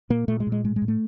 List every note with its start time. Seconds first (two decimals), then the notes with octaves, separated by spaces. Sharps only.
0.10 A#2 A#3
0.28 A#2 A3
0.40 G#3
0.47 A#2
0.52 G#3
0.64 A2 G#3
0.76 G#3
0.82 A2
0.88 A3